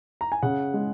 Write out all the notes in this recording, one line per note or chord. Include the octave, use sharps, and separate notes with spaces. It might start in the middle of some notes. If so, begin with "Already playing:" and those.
A#5
G#5
C#3 F#5
G#3